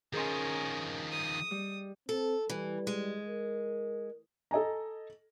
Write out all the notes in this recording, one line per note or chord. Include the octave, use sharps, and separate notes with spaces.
D#3 F3 C#4 G#4 A#4 D#5 C6
D#6
G3
C4 A4
E3 G3
G#3
A#4
A4 D#5 G#5 A#5